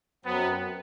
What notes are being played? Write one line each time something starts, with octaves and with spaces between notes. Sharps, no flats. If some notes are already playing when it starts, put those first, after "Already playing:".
F#2 F#3 B3 C4